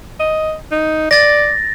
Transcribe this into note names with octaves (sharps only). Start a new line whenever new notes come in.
D#5
D#4
D5 A6 A#6